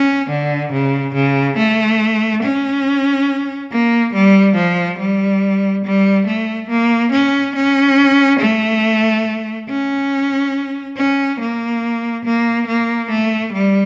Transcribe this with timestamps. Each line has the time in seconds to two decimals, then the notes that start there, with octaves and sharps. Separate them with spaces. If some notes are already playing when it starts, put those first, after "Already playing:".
Already playing: C#4
0.31 D3
0.73 C#3
1.15 C#3
1.58 A3
2.43 C#4
3.72 A#3
4.14 G3
4.57 F3
4.99 G3
5.85 G3
6.27 A3
6.70 A#3
7.12 C#4
7.56 C#4
8.40 A3
9.70 C#4
10.97 C#4
11.40 A#3
12.25 A#3
12.67 A#3
13.11 A3
13.53 G3